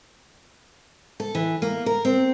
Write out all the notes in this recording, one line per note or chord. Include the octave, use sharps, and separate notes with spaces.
A4
E3
A#3
A#4
C4